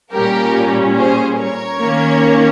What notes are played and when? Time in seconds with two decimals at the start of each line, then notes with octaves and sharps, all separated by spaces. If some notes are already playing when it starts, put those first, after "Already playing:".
0.13 A#2 G3 C#4 G4 A#4
0.96 G#4 C5
1.38 A#4 C#5
1.79 D#3 A#3 C#4